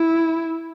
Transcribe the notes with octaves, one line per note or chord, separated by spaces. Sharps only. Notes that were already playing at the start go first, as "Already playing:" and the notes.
Already playing: E4